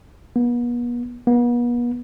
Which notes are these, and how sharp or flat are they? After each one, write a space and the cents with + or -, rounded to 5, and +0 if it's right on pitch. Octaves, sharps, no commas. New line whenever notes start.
B3 -40
B3 -40